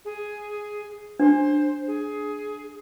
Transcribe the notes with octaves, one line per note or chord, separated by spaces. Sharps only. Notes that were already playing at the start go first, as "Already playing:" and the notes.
G#4
D4 C5
G#4